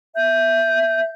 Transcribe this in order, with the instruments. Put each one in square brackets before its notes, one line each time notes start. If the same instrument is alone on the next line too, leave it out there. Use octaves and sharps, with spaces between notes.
[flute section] E5 G6